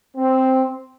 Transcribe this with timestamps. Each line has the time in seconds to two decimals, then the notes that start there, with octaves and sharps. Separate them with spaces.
0.16 C4